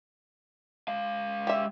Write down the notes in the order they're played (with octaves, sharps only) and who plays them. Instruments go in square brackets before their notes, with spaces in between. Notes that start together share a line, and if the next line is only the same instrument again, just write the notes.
[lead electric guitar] G#3 F5
[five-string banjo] G4 E5